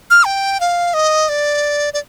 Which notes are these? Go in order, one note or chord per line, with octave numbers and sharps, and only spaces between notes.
F6
G5
F5
D#5
D5
D5